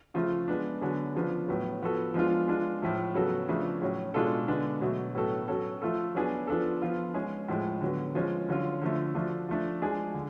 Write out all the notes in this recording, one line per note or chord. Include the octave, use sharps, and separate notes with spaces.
C#3 F3 A3 F4
G#3 B3 D4
D3 F#3 B3 D4 G#4
C#3 F3 B3 D4
A2 F#3 B3
F3 B3 F#4 A4
F3 G#3 B3 D4 F4
G#3 D4 F4
A2 F3 A3
C#3 F#3 B3 F#4 A4
C#3 F3 A3 D4
A2 F#3 C#4
B2 G#3 D4 F4 A4
D3 G#3 B3 D4
B2 F#3 A3
A2 F#3 B3 F#4 A4
F#3 C#4 F#4 A4
F3 A3 F4 A4
F#3 B3 D4 G#4
F3 B3 D4 F4 A4
F3 B3 F4
G#3 C#4 G#4
A2 F3 G#3
D3 F#3 B3
F3 G#3 C#4
D3 F#3 C#4 F4
D3 F3 A3
F3 A3 D4 F#4
F3 A3 D4
F3 G#3 D4 G#4
D3